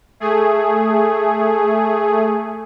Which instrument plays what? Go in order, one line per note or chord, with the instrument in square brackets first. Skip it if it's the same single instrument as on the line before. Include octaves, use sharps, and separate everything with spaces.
[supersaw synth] A3 G#4